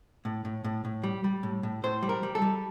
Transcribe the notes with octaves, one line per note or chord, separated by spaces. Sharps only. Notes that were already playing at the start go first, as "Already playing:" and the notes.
A2
A2
A2
A2
G3
G3
A2
A2
A2 C5
G3
A#4
G3
A4
G3